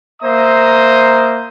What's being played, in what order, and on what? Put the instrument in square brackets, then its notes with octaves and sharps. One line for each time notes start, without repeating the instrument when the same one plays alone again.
[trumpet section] A#3 C5 E5 A#5 D#6